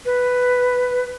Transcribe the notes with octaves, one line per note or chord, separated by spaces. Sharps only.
B4